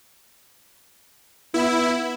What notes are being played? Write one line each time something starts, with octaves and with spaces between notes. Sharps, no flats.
B3 E4